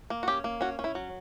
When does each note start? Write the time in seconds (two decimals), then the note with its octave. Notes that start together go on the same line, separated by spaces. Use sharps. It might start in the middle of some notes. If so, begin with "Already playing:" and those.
0.10 A#3
0.23 F#4
0.28 C#4 G4
0.44 A#3
0.61 C#4 F#4
0.79 C#4
0.84 E4
0.95 F#3